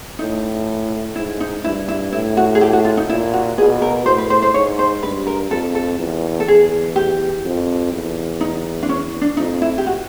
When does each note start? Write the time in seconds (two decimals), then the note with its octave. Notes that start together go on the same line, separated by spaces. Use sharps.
0.19 A2 D#4
1.16 G#2 E4
1.40 D#4
1.64 G2 E4
1.88 E4
2.12 A2 E4
2.37 F#4
2.55 G#4
2.61 G4
2.73 F#4
2.85 F4
2.97 D#4
3.09 A#2 E4
3.33 F#4
3.58 B2 G#4
3.82 A#4
4.06 A2 C5
4.18 B4
4.30 C5
4.42 C5
4.54 G#2 C#5
4.79 C5
5.03 G2 B4
5.27 A#4
5.51 F2 A4
5.75 A4
5.99 E2
6.40 A4
6.48 E2 G#4
6.96 G4
7.45 F2
7.92 E2
8.41 D#4
8.83 D4
8.89 C#4
9.21 D4
9.37 F2 D#4
9.62 E4
9.78 G4
9.86 F#4